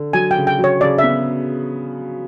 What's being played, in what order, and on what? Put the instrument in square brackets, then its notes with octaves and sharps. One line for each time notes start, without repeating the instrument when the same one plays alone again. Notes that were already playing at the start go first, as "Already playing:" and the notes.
Already playing: [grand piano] D3
[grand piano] F#3 [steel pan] G#5
[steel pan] G5
[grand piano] C#3
[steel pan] G5
[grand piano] F#3
[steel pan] C#5
[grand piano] C#3 [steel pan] D5
[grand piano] B3 [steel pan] E5